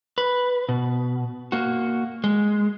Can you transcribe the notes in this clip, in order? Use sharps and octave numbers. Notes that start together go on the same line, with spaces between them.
B4
B2
A#3 F#4
G#3